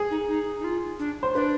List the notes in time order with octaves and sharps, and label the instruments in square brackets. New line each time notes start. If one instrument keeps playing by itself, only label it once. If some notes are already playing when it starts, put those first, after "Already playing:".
Already playing: [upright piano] G#4
[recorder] D#4
D#4
D#4
F4
D4
[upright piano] C5
[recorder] D4 [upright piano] B4